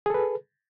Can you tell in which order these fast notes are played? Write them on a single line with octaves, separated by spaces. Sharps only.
G#4 A4 B4